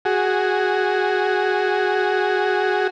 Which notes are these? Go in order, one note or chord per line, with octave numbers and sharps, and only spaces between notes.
F#4 G#4